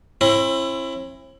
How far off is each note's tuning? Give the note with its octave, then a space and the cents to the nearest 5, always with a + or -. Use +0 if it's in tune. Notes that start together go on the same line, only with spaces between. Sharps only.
C4 +45 E4 +20